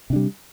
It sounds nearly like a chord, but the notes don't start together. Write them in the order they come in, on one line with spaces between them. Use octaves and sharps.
C3 D4 G3